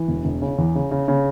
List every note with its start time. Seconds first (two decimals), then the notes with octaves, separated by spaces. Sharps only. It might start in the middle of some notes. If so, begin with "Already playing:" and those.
Already playing: E3
0.08 E1
0.25 E1
0.42 C#3
0.58 E2
0.75 C#3
0.91 C#3
1.08 C#3